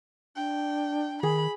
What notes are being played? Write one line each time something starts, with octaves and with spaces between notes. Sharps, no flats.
D4 G5
D#3 G#4 B5